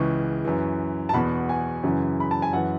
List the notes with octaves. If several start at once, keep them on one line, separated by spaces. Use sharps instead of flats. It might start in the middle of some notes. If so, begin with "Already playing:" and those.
Already playing: C#2 C#3 E3 C#6
F#2 E3
A5
E2 B2 B5
G#5
F#2 C#3 E3
B5
A5
G#5
F#2 E3 F#5